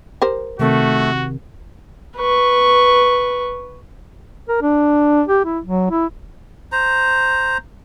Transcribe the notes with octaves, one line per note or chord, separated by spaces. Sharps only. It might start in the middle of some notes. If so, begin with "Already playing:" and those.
G4 A#4 C5
C3 D#3 A3 C4 F#4
B4 C#6
A#4
D4
G4
E4
F#3
E4
C5 A#5